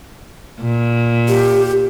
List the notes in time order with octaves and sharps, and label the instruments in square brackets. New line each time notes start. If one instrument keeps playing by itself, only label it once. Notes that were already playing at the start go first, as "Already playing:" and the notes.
[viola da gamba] A#2
[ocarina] G4